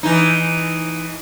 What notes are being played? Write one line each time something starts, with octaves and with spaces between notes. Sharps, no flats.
E3 D#4